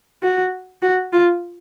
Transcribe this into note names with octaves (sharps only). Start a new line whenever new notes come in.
F#4
F#4
F4